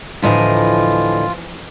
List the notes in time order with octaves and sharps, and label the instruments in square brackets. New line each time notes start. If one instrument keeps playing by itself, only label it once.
[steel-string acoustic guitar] D2 A2 D#5 [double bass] E3 F3 [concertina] F4